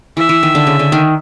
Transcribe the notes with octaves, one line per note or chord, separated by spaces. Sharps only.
E3 E5
E3
D#3
D3
C#3
D3
D#3